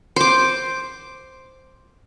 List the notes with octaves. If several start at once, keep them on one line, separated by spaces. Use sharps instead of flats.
C5 D6